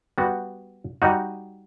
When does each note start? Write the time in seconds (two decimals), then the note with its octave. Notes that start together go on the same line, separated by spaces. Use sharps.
0.18 G3 B3 F#4
1.02 G3 D#4 F#4